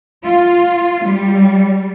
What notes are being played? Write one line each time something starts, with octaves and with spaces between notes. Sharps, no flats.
F4
G3